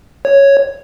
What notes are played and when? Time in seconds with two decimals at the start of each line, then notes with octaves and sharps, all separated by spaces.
0.25 C#5